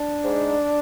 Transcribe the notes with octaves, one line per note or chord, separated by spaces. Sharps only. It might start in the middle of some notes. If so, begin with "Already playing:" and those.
Already playing: D4
G#2